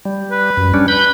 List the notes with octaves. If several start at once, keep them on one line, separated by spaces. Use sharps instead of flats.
G3
B4
F#2
G3 C#4 D4
B4 B5 G6